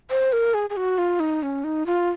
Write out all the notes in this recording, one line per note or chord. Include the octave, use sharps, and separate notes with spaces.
C5
A#4
G#4
G#4
F#4
F4
D#4
C#4
D#4
F4